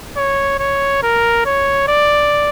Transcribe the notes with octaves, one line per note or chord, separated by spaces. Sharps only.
C#5
C#5
A#4
C#5
D5